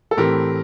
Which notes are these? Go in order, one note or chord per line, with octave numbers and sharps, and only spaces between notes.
A4
A2 E3 A3 C4 G4 A#4